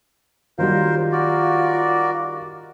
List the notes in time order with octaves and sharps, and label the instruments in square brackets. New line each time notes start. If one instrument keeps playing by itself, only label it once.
[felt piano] D#3 F#3 G3 [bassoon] F4 [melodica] A#4 C5
[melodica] F#4 A#4 D5